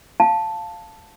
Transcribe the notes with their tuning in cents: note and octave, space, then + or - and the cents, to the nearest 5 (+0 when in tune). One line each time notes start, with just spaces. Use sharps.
F5 +0 A5 +0